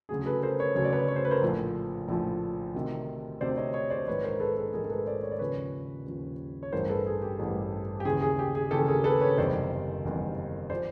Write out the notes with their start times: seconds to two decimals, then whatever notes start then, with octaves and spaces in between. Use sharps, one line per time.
0.09 D2 C#3 F#3 G#4
0.26 A4 B4
0.43 A#4 C5
0.59 B4 C#5
0.75 D2 C#3 F#3 C#5
0.85 D5
0.93 B4 C#5
1.08 C#5
1.16 C5
1.25 B4
1.31 A#4 C5
1.42 A#1 A2 F3
2.08 A#1 A2 F3
2.74 D2 C3 D#3
3.41 D2 C3 D#3 C5 D5
3.57 C#5 D#5
3.74 C#5 D#5
3.90 C5 D5
4.07 A#1 G#2 D#3 B4 C#5
4.23 A#4 C5
4.40 A4 B4
4.57 G#4 A#4
4.73 A#1 G#2 D#3 G#4 A#4
4.85 A#4
4.90 A4 B4
5.06 C5 D5
5.23 C#5
5.32 D5
5.39 D#2 C#3 F3 B4 C#5
6.06 D#2 C#3 F3
6.63 C#5
6.72 A1 G2 E3 A#4 C5
6.89 A4 B4
7.06 G#4
7.22 G4
7.39 A1 G2 E3
8.00 G4
8.05 D#2 C#3 E3 G#4
8.22 G#4
8.39 G4
8.55 G#4
8.71 D#2 C#3 E3 G4 A4
8.88 G#4 A#4
9.04 A4 B4
9.21 B4 C#5
9.37 F#1 E2 C3 D#3 G3 C5 D5
10.05 F#1 E2 C3 D#3 G3
10.70 F3 C5 D5